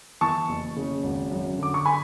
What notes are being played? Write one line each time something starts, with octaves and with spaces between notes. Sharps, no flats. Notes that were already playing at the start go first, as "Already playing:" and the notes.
E3 A5 C#6
F#1
C#3
G#1
F#2
D3 D6
C#6
G#5 B5